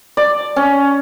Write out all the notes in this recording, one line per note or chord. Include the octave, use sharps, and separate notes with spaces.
D5
C#4